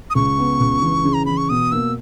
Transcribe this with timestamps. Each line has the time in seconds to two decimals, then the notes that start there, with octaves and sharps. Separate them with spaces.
0.10 D#6
0.15 C#2 C#6
0.39 B3
0.60 C#2
0.82 E3
1.04 C#3
1.14 A#5
1.26 E3 B5
1.37 C#6
1.49 B2 D#6
1.72 A#3 E6